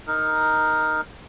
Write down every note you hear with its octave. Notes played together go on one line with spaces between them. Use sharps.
D#4 A#4